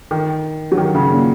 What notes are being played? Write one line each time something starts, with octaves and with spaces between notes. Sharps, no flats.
D#3
F#3
D#3
C#3
A#2